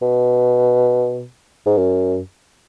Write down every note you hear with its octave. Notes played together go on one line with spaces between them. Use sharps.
B2
G#2
F#2